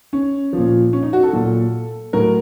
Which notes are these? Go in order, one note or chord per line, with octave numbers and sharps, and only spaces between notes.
C#4
A#2 F3
C#4
D#4
F#4
A4
A#2 F#3
A2 F#3 A#4